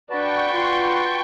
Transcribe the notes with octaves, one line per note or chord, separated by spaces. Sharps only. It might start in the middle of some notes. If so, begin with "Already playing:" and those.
D4 F#4 B4 G5 A5 C#6
F4 C6